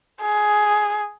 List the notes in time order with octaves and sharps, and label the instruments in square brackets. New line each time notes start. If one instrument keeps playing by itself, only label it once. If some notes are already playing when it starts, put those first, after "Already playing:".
[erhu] G#4